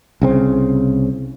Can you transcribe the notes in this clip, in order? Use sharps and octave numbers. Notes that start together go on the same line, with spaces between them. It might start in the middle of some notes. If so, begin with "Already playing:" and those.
C2 C#3 C4